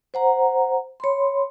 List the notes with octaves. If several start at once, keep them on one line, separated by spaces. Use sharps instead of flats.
C5 F#5 A#5
C#5 B5 C6